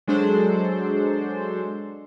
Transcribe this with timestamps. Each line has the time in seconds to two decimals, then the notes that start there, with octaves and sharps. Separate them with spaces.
0.07 F#3 G#3 D4 A4 C5